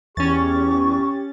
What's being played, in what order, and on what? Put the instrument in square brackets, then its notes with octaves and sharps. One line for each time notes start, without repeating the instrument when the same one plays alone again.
[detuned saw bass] E2 [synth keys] C#4 A6 [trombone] G4 [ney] C#6